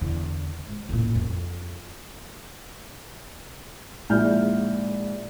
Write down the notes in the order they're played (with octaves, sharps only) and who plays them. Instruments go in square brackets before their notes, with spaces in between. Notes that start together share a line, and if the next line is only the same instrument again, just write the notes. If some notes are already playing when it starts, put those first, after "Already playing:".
[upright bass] E2 D3
G#2
A1 A#2
F2
[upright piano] A#1 G#2 E4 F6 G6